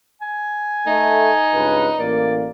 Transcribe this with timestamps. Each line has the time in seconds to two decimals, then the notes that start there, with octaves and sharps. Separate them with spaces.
0.21 G#5
0.87 A3 D#4
1.53 C#2 G2 B4
1.98 A1 A#3 D5